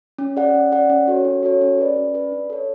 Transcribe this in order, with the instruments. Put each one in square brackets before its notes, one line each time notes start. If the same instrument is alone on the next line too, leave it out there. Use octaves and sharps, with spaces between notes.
[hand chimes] C#4
G#4 D5 F#5
C#4
G#4 D5 F#5
C#4
F#4 A4 C#5
C#4
F#4 A4 C#5
C#4
G#4 B4 D5
C#4
G#4 B4 D5
D4
A4 C#5